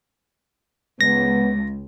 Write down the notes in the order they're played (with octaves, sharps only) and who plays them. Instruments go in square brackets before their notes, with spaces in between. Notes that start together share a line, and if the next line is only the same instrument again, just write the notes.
[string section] C#2 [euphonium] B3 [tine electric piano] A#6